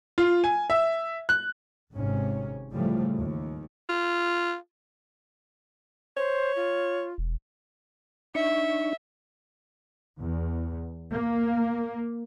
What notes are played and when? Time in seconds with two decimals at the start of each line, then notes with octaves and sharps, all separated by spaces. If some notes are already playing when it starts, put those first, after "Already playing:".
0.18 F4
0.44 G#5
0.70 E5
1.29 F#6
1.95 G#1 G#2 C3 C#4
2.72 A2 C#3 E3 F3 G3 A3
3.16 D#2
3.89 F4
6.17 C5 C#5
6.56 F4
7.18 E1
8.35 D4 D#4 E5 C#6
10.19 E2
11.12 A#3